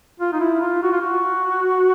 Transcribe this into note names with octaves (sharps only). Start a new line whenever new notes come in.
F4
D#4
E4
F4
F#4
F4
F#4